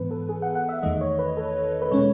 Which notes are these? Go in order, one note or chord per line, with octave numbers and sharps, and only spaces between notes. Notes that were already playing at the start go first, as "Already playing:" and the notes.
Already playing: G#2 E3 B3 B4
A4
G#4
F#5
F#5
E5
E2 D#3 A3 D#5
C#5
B4
A4
B4
B2 G#3 C#4 C#5